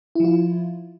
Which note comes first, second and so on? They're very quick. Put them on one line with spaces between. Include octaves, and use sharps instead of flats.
E4 F3 F4